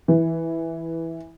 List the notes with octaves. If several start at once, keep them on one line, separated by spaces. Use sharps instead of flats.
E3